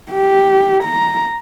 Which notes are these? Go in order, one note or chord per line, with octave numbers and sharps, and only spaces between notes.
G4
A#5